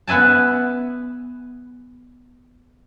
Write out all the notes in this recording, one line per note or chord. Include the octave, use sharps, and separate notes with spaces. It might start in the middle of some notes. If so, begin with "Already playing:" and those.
B3 B4 E5 G#5 A5